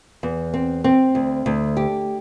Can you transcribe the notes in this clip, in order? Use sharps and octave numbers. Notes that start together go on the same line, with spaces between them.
E2
C4
C4
D2
D2
G4